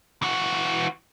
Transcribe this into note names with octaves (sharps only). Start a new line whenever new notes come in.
E3 F#4